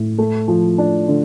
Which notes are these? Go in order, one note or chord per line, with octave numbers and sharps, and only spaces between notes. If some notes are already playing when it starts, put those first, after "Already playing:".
Already playing: A2
A3
F3
D4
D3